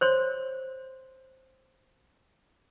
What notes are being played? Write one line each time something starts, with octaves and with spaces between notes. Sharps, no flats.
C5 C#5 C6